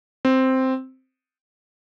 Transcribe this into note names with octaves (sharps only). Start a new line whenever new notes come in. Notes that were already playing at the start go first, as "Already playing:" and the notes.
C4